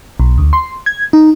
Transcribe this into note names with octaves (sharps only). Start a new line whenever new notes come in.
B1
D2
C6
G#6
D#4